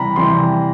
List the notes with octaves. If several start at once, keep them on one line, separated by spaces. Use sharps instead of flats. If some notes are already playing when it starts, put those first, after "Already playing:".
Already playing: C3 E3 G3 A#5 B5
C3 E3 G3 C6